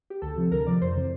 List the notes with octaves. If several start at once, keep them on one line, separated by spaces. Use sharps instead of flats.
G4
D2 A4
C3 F3
D2 A#4
C3 F3 D5
F2 C5
C3 E3